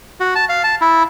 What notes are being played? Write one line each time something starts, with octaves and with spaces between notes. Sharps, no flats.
F#4
A5
F5
A5
E4